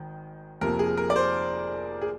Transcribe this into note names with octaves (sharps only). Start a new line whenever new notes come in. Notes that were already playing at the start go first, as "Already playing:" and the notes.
Already playing: G#1 D#3
F1 F2 C3 F3 A#3 A#4
G#4
A#4
D5
C5
G#4